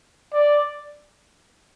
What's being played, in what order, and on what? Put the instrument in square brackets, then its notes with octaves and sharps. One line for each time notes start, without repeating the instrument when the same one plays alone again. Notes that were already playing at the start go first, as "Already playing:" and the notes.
[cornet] D5